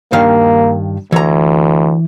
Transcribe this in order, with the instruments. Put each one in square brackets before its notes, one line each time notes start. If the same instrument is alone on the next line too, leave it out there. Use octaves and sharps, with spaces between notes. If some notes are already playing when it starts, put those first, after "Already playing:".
[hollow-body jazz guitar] G2 D#3 F5 [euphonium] A#3
[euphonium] D2 [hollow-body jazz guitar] E3 A#5